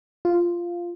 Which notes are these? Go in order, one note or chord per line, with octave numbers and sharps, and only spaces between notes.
F4